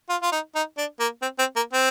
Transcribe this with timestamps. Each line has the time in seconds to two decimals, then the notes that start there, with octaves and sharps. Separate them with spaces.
0.09 F4
0.22 F4
0.32 D#4
0.55 D#4
0.78 D4
1.00 A#3
1.22 C4
1.39 C4
1.56 A#3
1.74 C4